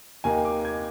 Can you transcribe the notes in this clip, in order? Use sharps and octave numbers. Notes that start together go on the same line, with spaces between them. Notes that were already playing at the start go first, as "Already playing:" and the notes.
D#2 D#3 A#3 G#5
D6
G#6